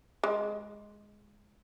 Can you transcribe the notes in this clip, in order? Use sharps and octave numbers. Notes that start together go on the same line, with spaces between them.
G#3